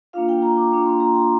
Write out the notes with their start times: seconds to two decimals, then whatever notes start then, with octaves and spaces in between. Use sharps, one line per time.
0.13 A#3 D4 F4 F5
0.29 G5
0.42 A#5
0.57 D6
0.72 A#3 D4 F4 D6
0.86 C6
1.00 A#5
1.15 G5